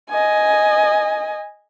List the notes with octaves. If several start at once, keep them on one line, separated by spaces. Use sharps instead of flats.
D#5 G#5